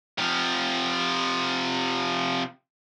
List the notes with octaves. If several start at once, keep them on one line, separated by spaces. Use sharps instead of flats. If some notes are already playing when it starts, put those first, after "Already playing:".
C3 F3